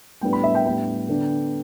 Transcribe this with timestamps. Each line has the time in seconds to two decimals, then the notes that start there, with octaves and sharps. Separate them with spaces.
0.21 A2 G3 B3 D4 G5
0.33 B5
0.44 E5
0.55 G5
0.65 A2 G3 B3 D4 G5
1.09 D3 B3 D4